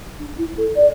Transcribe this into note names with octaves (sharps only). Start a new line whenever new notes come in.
D4
E4
A4
D5